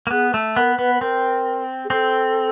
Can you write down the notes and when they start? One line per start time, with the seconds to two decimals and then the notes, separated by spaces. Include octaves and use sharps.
0.07 A#3
0.11 B3 G#4
0.34 A3
0.56 B3 A#4
0.78 B3 B4
0.95 B4
1.00 C4 A#4
1.85 G#4
1.90 C4 A4